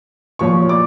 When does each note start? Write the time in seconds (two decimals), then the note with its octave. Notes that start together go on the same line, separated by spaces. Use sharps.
0.39 A#2 F3 A#3 C#5 C#6
0.69 D5 D6